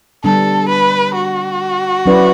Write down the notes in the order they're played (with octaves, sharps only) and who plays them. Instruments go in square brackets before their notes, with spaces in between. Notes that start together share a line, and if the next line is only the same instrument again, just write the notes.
[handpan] D3 G3 B3 D4 [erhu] A4
[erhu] B4
F#4
[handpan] F#3 C#4 E4 B4 D5